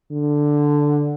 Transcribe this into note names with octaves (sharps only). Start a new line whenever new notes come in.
D3